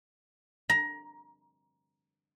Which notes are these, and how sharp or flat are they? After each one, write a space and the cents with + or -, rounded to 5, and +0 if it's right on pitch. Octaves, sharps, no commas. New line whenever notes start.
A#5 +20